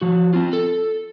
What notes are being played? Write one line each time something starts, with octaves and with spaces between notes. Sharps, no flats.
F3 F#4
C4 F4
A4